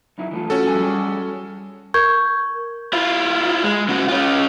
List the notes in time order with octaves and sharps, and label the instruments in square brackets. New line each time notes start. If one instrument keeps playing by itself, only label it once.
[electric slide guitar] F#2 D#4 E4
E3 A3 F4
[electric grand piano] C#4 F#4 A4
[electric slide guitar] F3 G3 G#5
G3 G#4 C#5
[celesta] A#4 C#6 G6 G#6
[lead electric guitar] E4 F4
G#3
C#3 F#4
C#4 F4